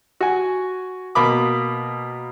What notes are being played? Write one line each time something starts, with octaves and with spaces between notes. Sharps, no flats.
F#4 G#5
B2 A#3 B5 D6